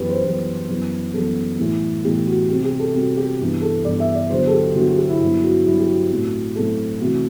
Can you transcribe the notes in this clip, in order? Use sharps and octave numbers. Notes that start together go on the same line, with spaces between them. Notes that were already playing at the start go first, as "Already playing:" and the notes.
Already playing: F#2 E3 G3 B3 G4 B4
C5
F#2 E3 G3 B3 B4
F#2 E3 G3 B3
F#2 E3 G3 B3 A4
A2 E3 G3 B3
A2 E3 G3 B3 G4
F#4
C3 G3 C4 G4
G4
A4
C3 G3 C4 F#4
G4
G2 E3 G3 B3
A4
G2 E3 G3 B3 D5
E5
D5
E2 D3 F#3 C5
A4
G4
E2 D3 F#3 F#4
F#4
G4
E4
G2 F#3 B3 E4
F#4
G2 F#3 B3 E4
G4
F#4
A2 F#3 C4
A2 F#3 C4 A4
C3 E3 A3 C4 F#4